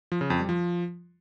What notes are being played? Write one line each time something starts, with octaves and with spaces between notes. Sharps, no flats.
F3
C#3
F2
G3
F3